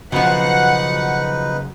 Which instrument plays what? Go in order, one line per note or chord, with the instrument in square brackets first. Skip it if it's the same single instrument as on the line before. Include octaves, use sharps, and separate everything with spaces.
[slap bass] F#1 [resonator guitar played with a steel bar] B2 F3 [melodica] D#4 B4 [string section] F#5